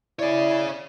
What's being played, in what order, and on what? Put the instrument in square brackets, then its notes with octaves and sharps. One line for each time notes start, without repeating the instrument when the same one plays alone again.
[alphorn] E4 [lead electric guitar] G#4 C#5 [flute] D5